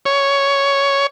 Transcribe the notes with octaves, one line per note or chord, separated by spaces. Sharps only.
C#5